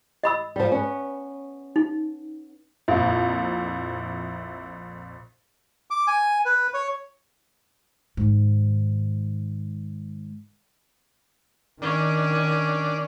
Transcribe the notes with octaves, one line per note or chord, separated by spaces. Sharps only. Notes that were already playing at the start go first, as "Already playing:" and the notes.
D#5 B5 E6
F3 G3
B3 C#4
D#4
A#1 F2 E4
D6
G#5
B4
C#5
G#2 D#3
D#3 C#4 D4